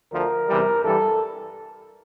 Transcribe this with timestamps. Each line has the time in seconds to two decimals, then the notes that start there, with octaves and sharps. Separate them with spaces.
0.11 D2 D3 F3 A#4
0.48 E2 C3 E3 G3
0.84 G2 E3 G3 A4